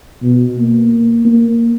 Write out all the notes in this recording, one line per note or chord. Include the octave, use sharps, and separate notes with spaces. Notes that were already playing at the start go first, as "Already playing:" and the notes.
B2
A#3
A#3